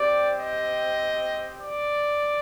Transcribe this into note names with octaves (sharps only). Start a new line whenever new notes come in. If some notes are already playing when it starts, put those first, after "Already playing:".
Already playing: C4 G4 D5
D#5
D5